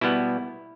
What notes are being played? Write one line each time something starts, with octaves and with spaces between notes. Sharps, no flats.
B2 G3 B3 E4